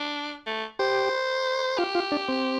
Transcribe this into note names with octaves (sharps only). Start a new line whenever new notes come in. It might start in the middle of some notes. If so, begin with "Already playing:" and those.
Already playing: D4
A3
G4 C5
F4 G4
F4
D4
C4